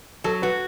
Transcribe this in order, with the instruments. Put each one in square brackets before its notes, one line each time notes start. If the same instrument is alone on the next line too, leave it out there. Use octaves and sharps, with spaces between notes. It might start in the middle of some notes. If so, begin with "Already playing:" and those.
[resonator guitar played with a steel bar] F#3 [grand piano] A4
[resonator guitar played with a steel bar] F#4 [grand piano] B4